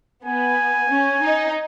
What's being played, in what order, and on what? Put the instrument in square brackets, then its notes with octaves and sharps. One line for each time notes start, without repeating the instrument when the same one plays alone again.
[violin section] B3 [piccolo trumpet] G#5
[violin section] C#4
D#4